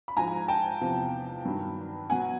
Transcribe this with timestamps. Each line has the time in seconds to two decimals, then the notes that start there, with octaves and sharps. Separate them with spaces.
0.08 B5
0.16 G#2 F3 G#5 A#5
0.48 G5 A5
0.81 E2 C3 F3
1.45 G2 D#3 F#3
2.10 B2 F#3 F#5 G#5